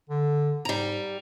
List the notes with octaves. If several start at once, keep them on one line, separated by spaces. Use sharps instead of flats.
D3
G#2 G3 A#5